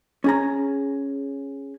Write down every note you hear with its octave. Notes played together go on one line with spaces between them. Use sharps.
C#4 G#4 A#5